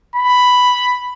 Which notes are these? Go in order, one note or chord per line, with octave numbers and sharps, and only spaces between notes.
B5